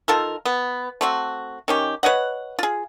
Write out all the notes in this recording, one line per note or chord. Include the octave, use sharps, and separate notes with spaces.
D#3 F4 A4 A#4
B3
A3 C4 F#4
D#3 C#4 G4
B4 C#5 D#5 F#5
F4 G#4